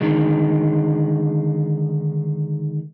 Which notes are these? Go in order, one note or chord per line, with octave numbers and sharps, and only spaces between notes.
D3 D#3 G#3